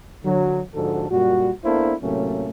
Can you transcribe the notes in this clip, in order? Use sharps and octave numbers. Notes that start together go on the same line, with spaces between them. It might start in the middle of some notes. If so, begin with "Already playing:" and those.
D3 F#3
G#2 D3 F3 F#4 A4
F#2 A#2 G3 F#4
A#3 B3 D4 E4 A4 C5
A2 C3 F#3 A3 A#3 C#4